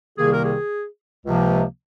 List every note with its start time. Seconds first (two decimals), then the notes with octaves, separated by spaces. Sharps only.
0.18 C2 C3 D#3 A#3 G#4
0.32 A#4
0.45 G#4
1.26 C#2 C3 F3 A#3